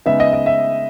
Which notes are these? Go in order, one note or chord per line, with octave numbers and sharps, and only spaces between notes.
C#3 G#3 B3 D#4 E5
D#5
D#5
E5